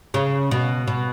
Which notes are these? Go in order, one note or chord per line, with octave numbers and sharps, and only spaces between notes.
C#3
B2
B2